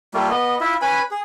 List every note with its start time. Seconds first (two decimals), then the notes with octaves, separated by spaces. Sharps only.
0.14 G3 A3 A#3 F4
0.30 B3 D#5
0.60 E4 F4 E5
0.82 C#4 B4 G#5 B5
1.11 G#4